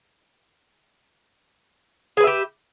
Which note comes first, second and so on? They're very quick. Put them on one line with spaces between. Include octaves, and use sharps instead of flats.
G#4 B4 E5 G4